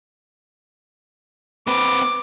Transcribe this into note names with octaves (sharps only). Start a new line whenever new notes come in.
C4 B4 D6